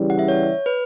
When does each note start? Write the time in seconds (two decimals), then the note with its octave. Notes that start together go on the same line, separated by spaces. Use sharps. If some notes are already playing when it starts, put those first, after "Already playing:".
Already playing: C#3 E3 G3
0.10 F#5
0.19 E5
0.28 C#5
0.66 B4